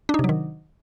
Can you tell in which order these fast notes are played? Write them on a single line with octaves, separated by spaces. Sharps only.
D4 D#4 C3 F#3 D#3